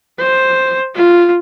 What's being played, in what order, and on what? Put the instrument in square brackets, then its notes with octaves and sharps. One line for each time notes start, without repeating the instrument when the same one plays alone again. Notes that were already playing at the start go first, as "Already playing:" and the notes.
[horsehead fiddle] C5
F4